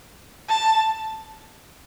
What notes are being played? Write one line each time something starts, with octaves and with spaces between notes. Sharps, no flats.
A5